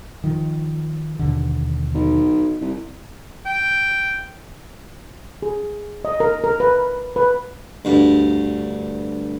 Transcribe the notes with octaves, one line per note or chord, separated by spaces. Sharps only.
D#3 F3
D#2 B2 D3
B1
C2
G5
G#4
D#5
A#4
A#4
B4
B4
D2 G2